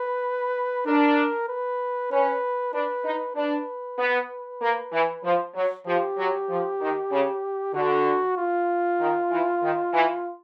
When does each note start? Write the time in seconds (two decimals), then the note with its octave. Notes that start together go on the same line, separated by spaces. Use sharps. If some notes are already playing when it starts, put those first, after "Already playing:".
Already playing: B4
0.86 D4 A#4
1.48 B4
2.11 C#4 B4
2.74 D4 B4
3.05 D#4
3.36 D4 B4
3.99 B3
4.62 A#3
4.93 E3
5.24 F3
5.55 F#3
5.87 F3 G4
6.18 F#3
6.50 F3
6.81 D#3
7.12 C#3
7.74 D3 F#4
8.37 F4
9.01 D#3
9.31 E3
9.63 D#3
9.94 E3